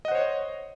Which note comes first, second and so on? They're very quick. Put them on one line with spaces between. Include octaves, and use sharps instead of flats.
D#5 F#5 C5 C#5